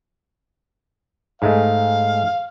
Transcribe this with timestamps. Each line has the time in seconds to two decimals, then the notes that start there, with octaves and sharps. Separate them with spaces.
1.42 G#2 G#3 A3 F5